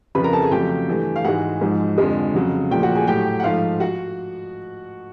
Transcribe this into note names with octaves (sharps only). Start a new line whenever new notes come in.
F2 C#3 F3 B4 B5
A#4 A#5
A4 A5
G#4 G#5
F2 C#3 F#3 A3 G4 G5
G2 E3 A3
F5
G#2 E3 G#3 F#4 F#5
G#2 F3 G#3
F2 D3 F3 G#3
F2 C#3 F#3
A#2 F3 A3 G4 G5
F#4 F#5
G#4 G#5
A2 F#3 A3 G4 G5
F#5
G#2 F3 A3 F4 F5
F#4 F#5